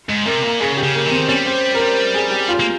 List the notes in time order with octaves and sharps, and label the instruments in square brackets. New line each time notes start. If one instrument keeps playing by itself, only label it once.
[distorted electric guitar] G#2
[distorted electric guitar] C3 [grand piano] A#4
[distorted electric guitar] A#2
[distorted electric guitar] C#3 [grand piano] G#4
[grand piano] G4
[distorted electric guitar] C#3
[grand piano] A#3
[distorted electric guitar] D#3
[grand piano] C4
[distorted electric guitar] G3 [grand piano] C#4
[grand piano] C5
A#4
C5
G#4
G4
F4
[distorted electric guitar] A#3